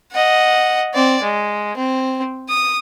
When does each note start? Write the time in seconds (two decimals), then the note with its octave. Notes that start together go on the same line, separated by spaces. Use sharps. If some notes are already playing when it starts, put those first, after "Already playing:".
0.12 D#5 F#5
0.94 C4 D5
1.22 G#3
1.77 C4
2.49 D#6